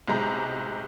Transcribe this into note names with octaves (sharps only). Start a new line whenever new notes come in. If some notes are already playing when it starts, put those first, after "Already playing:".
B1 A2 C3 G#3 A#5